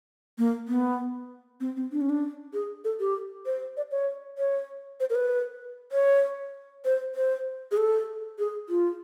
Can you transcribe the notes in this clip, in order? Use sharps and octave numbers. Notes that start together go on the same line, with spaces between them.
A#3
B3
C4
C4
D4
C#4
D4
G#4
A4
G4
C5
D5
C#5
C#5
C5
A#4
B4
C#5
C5
C5
G#4
A4
G#4
F4